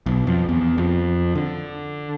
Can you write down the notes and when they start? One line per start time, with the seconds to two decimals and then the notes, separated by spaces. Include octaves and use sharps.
0.06 B1
0.27 F2
0.49 E2
0.78 F2
1.35 D3